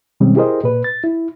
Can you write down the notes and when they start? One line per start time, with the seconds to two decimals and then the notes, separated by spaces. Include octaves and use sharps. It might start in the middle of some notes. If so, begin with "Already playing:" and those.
0.20 B2 D#3 G3 G#3 C4 C#4
0.35 E4 G4 G#4 A#4 C5 D#5
0.64 A#2 B4
0.84 A6
1.04 E4